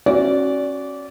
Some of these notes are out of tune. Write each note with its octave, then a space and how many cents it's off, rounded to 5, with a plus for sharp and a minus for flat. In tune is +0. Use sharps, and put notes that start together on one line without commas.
C#4 -25 F#4 +0 D5 -20